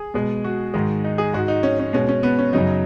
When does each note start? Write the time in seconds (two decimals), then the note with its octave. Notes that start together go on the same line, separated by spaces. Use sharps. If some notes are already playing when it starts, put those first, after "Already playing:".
Already playing: G#4
0.14 B2 G#3
0.44 F#4
0.74 G#2 D#3 G#3
1.04 D#4
1.18 G#4
1.33 G#2 G#3 F#4
1.48 D#4
1.63 C#4
1.79 C#4
1.93 B2 G#3 C#4
2.09 C#4
2.23 B3
2.39 C#4
2.53 F#2 C#3 F#3 D#4